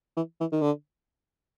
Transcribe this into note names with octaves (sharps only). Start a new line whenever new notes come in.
E3
E3
D#3
D3